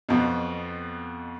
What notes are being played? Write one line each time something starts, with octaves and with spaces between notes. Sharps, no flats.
F2 B2